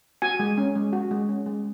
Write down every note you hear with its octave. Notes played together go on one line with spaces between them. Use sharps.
F#4 G#5
G#3
C#4
G#3
F#4
G#3
C#4
G#3